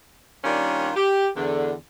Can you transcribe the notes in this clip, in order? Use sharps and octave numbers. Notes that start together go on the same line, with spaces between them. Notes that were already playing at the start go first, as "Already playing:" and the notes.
D#3 G3 A#3 C#4 D4 F4
G4
E2 D3